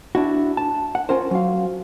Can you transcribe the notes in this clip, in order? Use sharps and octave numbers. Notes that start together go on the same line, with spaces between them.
D4 E4 F#4
A5
F#5
C#4 F4 A#4 C5
F#3 F5